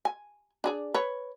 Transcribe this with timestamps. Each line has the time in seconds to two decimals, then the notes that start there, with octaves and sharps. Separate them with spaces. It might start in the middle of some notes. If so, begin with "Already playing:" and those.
0.05 G#5
0.64 D4 G#4 D5
0.94 B4 C#5